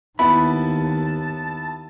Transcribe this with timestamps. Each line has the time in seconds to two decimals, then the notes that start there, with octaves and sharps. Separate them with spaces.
0.19 D#2 B3 E4 A5 B5